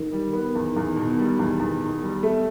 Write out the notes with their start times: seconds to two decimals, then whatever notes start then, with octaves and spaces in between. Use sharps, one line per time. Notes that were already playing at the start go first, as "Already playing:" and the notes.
Already playing: D#3
0.12 G3
0.33 B3
0.55 E2
0.76 E2
0.96 B2
1.19 G3
1.39 E2
1.59 E2
1.81 B2
2.02 G3
2.23 A3